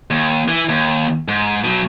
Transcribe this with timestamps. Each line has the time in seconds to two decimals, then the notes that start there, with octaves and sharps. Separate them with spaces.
0.11 D#2
0.48 E3
0.69 D#2
1.28 G#2
1.64 B2 F#3